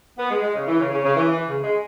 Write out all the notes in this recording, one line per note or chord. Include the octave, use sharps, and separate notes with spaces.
B3
G#3
G#3
C#3
E3
C#3
C#3
C#3
E3
E3
C#3
G#3